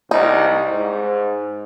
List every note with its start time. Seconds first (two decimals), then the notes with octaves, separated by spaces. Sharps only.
0.11 C2 D#4
0.71 G#2